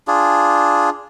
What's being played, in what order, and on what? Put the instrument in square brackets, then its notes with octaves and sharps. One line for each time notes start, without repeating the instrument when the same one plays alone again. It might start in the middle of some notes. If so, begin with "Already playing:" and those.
[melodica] D4 F4 G#4